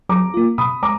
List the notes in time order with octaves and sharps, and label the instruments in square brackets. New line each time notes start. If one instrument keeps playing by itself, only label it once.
[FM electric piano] F#3 [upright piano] A#5 D6
[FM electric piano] A#3 F4
[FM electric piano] B2 [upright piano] B5 D#6
[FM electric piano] G#3 [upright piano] A#5 D6